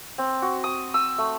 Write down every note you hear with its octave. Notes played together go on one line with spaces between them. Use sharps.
C4
F#4
D#6
E6
A3